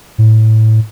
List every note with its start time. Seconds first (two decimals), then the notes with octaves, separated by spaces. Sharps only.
0.18 A2